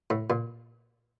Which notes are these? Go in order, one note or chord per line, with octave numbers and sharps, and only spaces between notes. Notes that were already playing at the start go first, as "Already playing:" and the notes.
A2
A#2